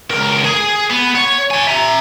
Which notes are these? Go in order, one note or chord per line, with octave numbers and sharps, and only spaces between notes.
C#2 A#4
G#4 G#5
B3
C#5
D5 G#5
E5 A#5